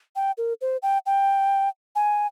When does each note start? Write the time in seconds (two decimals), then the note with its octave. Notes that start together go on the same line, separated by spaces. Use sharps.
0.16 G5
0.38 A#4
0.61 C5
0.83 G5
1.06 G5
1.96 G#5